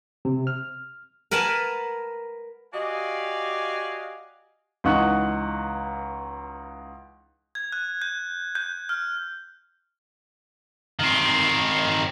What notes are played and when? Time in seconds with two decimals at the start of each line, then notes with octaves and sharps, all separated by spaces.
0.25 C3
0.47 F6
1.31 A#4 B4 F#5 G#5 A5
2.73 F#4 G4 D5 D#5 F5 G#5
4.84 C#2 E3 D#4 F#5 C#6 F#6
7.55 G#6
7.72 F#6
8.02 G6
8.55 G6
8.89 F6
10.99 D#3 C4